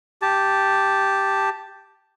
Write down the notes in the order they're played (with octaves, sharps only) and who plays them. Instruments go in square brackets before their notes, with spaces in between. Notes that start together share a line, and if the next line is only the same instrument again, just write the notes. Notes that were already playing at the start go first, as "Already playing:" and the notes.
[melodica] G4 A5